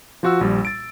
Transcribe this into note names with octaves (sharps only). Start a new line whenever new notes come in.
F3 F4 F#4 F#5 E6
A#1 G3
A6 D7